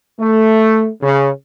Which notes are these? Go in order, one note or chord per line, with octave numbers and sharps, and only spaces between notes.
A3
C#3